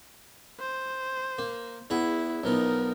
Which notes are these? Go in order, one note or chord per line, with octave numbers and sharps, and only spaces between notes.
C5
A#3
E2 E4 G#4 F#5
B1 F3 B3 D#4 A#4